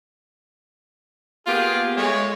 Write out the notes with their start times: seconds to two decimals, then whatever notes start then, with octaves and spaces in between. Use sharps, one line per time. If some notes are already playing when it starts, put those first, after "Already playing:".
1.47 A#3 B3 F4 G4 G#4
1.96 G#3 A3 C#5